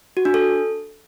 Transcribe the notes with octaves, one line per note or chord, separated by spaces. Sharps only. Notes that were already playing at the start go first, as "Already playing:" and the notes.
F#4
D4
A4